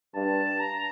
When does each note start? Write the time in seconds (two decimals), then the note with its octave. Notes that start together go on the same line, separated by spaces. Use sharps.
0.15 G2 A5
0.60 A#5